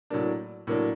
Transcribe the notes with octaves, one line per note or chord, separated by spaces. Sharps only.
A2 F#3 A#3 D4
A2 F#3 A#3 D4